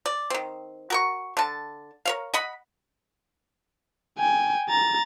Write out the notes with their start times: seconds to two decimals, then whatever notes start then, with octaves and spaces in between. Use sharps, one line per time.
0.06 D5
0.30 D#3 C4
0.90 F#4 A#4 C#6
1.37 D3 A5
2.05 A#4 C#5 F5
2.34 D#5 F#5 B5
4.18 G5 G#5
4.70 A#5 A6